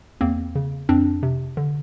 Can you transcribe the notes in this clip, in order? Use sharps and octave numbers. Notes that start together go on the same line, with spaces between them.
E2 A#3 C4
C#3
F2 C4 D4
C3
D3